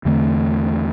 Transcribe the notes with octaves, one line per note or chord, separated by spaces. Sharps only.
E2 D3 A3 C4